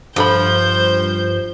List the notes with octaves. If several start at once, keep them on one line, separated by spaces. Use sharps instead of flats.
G2 F3 D4 A4 C5 B5 G6